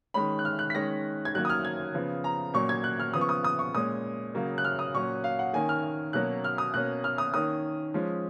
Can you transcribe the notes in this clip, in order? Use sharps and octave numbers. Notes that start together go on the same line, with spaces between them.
D#3 G#3 C#4 B5
F#6
F6
F#6
B6
D#3 G#3 C#4 A#6
G#6
D#3 F#3 A#3 C#4 F#6
D#6
F6
G#6
C#3 F3 B3
A#5
A#2 F#3 C#4 C#6
G#6
F#6
F6
C#3 F3 B3 D#6
C#6
D#6
D#6
C#6
A#2 G#3 C#4 D#6
C#3 F#3 A#3 C#4
F#6
F6
D#6
A#2 F#3 C#4 C#6
F5
F#5
D#3 A#3 C#4 G#5
F6
B2 F#3 A#3 C#4 F#6
F6
D#6
B2 A#3 C#4 F#6
F6
D#6
D#3 A#3 C#4 D#6
F3 G#3 C#4